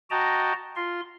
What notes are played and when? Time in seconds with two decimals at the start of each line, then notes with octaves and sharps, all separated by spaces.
0.11 F#4 D#5 G5 A5 A#5
0.76 F4 C6